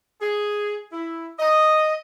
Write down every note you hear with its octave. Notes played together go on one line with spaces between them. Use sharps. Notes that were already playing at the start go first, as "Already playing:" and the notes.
G#4
E4
D#5